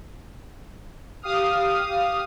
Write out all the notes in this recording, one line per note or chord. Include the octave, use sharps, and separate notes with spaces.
G4 F5 D#6 F6